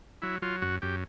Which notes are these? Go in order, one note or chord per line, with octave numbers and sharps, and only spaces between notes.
F#3 E4
F#3 F4
F#2 F#4
F#2 G4